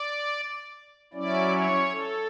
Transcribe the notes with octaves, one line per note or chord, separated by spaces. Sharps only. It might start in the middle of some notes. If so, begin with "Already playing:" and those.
Already playing: D5
F#3 C#4 E4 D5
C#5
A4